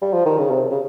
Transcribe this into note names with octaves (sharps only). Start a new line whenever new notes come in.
G3
F3
D#3
C#3
C3
C#3